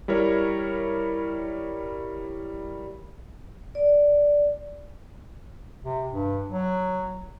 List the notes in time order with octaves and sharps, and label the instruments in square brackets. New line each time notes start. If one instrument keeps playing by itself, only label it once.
[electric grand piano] G3 E4 A#4 C#5
[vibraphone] D5
[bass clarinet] C3
G2
F#3